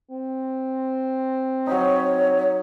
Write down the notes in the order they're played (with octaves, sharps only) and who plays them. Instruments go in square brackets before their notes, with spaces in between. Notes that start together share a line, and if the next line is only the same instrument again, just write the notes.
[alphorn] C4
[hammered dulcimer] F#3 D#4 [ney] C#5